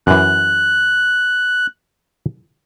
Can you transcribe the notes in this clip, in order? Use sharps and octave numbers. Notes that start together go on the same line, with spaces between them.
F#2 E3 F#6